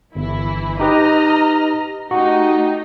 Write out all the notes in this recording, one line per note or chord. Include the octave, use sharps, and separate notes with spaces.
G1 E3 E4
D#4 G4 B4 D#5 A#5 F6
A3 D#4 F#4 G4